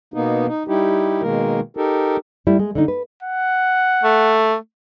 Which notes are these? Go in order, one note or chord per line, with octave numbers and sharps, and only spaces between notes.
B2 A#3 B3 D#4
D#4
G3 D#4 E4 G4
B2 D#3 G#3 A#3 A#4
D#4 G4 A4 A#4
G3 A3 E4
G#3
D3 D4 D#4
B4
F#5
A3